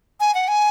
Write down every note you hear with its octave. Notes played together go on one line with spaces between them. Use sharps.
G#5
F#5
G#5